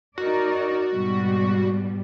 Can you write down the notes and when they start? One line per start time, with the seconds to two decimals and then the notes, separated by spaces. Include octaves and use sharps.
0.18 D#4 F#4 A#4 D5
0.92 G#2 B2 G3